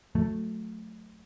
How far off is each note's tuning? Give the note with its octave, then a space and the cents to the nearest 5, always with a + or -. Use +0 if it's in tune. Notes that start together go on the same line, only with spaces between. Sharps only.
F#3 -25 A3 +0